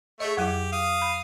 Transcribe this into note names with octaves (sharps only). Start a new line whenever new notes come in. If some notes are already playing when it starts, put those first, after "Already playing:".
A3 G#4 C#5 D#5
F2 F#3 E4 G4
F5 D#6
B5